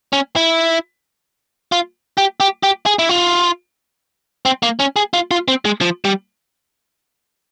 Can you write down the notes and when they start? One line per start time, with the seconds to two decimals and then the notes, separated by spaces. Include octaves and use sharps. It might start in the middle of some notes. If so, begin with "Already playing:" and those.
0.13 C#4
0.36 E4
1.72 F4
2.18 G4
2.40 G4
2.63 G4
2.86 G#4
2.99 E4
3.09 F4
4.45 C4
4.63 A#3
4.80 C#4
4.96 G#4
5.14 F4
5.31 F4
5.48 C4
5.65 G#3
5.81 F3
6.05 G3